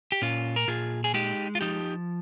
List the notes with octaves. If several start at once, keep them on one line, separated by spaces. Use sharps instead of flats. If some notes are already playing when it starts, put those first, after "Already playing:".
G4
A#2 C#4 F4
A#4
A#2 F4 G#4
G#4
G#3 D#4 G4
F4
F3 D#4 G4